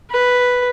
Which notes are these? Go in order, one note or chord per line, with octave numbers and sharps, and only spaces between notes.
B4